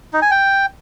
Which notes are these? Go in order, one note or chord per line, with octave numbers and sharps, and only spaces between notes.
D#4
G#5
G5